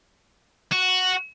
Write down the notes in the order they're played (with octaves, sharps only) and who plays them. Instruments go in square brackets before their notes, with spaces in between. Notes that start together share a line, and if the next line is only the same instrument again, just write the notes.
[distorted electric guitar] F#4